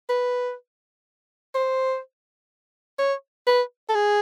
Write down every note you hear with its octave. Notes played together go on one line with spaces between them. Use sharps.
B4
C5
C#5
B4
A4
G#4